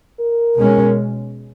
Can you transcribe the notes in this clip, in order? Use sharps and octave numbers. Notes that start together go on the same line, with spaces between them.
A#4
B2 G#3 C#4